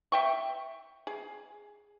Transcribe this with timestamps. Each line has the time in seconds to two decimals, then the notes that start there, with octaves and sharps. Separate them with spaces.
0.12 E5 G5 C#6
1.07 G#4